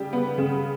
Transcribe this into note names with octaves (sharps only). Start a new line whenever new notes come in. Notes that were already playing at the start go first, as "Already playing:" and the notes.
Already playing: C#3 G3 G4
B3
C#3